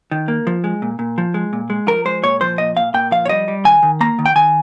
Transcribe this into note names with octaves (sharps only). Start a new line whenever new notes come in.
D#3
A#3
F3
G#3
A#2
A#2
F3
G#3
A#2
G#3
F3 A#4
G#3 C5
A#2 C#5
F3 C5
A#2 D#5
A#2 F5
A#2 G5
F3 F5
C#5
G3 D#5
G3
D#3 G#5
D#3
A#3 A#5
D#3
G5
D#3 G#5